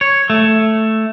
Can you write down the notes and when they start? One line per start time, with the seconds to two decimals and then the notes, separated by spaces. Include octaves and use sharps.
0.01 C#5
0.30 A3